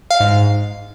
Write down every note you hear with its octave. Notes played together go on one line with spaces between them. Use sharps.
F5
G#2